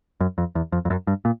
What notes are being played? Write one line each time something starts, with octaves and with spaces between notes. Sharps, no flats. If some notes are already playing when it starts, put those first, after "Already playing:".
F#2
F2
E2
F2
F2
F#2
G2
A#2